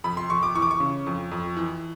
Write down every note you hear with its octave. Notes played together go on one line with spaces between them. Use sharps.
F2 B5
C6
F2 C#6
D6
E3 C#6
D6
C#6
C#3
F2
F2
E3